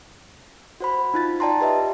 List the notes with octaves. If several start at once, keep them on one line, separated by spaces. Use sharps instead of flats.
F#4 C5 B5
D#4 F4 A6
D5 G5 A5 A#5 C6
G4 B4 D#5 E5